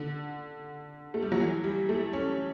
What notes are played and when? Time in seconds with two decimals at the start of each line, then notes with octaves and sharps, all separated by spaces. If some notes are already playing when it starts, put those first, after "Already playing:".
Already playing: D3
1.14 A3
1.22 G3
1.32 F#3
1.40 E3
1.64 G3
1.89 A3
2.13 C#4